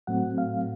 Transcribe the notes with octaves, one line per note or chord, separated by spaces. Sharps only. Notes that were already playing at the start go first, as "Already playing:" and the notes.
A2 F#3 A3 C4 F#5
F5